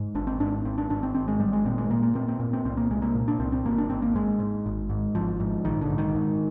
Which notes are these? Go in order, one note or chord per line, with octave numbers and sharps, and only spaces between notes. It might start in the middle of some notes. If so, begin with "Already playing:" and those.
Already playing: G#2
G#1 D4
C4
G#2 D4
G#1 C4
D4
G#1 D4
C4
G#1 C4
G#3
G#1 G3
G#3
A#2 C4
G#3
A#2 A#3
A#3
A#2 C4
C4
A#2
C4
C2 C4
A#3
C2 G#3
A#3
A#2
D4
C2 C4
C4
G#1 A#3
D4
G#1 C4
A#3
G#2 G#3
G#2
G#1
G#2
G#1 F3
G#2
A#1 D#3
D3
G#2
D#3
G#2